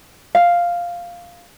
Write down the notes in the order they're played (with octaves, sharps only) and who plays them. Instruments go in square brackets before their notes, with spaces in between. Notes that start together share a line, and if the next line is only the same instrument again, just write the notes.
[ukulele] F5